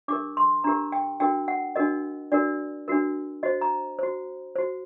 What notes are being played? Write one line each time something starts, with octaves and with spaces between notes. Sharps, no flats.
D4 G4 A#4 D6
C6
D4 G4 A#4 A#5
G5
D4 F#4 A#4 G5
F#5
D4 F#4 A#4 D#5
D4 F#4 A#4 D5
D4 F#4 A#4
F#4 C5 D#5
A#5
F#4 C5
F#4 C5